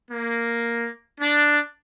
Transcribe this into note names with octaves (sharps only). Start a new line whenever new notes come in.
A#3
D4